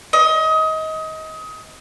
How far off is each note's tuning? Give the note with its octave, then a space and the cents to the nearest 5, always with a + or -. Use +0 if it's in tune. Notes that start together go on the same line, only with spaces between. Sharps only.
D#5 +25